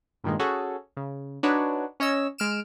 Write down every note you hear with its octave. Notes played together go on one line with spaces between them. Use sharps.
G2 A#2 D#3 G#3
C#4 F#4 G#4 A4
C#3
D4 D#4 F#4 B4 C#5
C#4 C#5 D#5 E6
G#3 F6 D7 E7